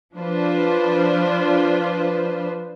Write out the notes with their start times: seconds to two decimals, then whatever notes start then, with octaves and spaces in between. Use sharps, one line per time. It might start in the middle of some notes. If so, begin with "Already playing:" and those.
0.15 F3 D4 F4 B4 C5